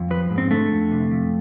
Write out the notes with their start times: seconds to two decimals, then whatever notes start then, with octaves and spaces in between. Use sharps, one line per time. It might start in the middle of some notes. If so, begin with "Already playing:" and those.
Already playing: F2
0.11 F3 B4
0.31 G#2
0.38 C4
0.51 D3 A3
0.72 F2
0.91 C3
1.11 F2